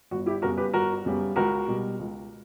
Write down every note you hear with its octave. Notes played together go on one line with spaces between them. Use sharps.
G1 F#4
E4 G4
F#2 C#3 G3 B3 F#4 A#4
G4 B4
G1 F#4 A#4
F#2 C#3 G3 B3
C#2 F#4 A#4
B2 G3
C#2